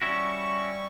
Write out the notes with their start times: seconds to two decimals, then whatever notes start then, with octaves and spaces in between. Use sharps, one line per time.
0.02 G3 C#4 E4 F#4 C#6